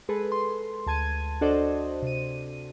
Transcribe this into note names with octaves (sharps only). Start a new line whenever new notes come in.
G#3 G#4 A4 B4
C6
D2 A5 G#6 D#7
D4 F#4 A4 C5 D5 D#5
C3 D#7